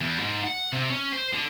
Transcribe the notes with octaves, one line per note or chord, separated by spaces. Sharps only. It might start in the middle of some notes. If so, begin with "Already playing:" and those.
E2
G#2
F#5
C3
C#4
C5
D3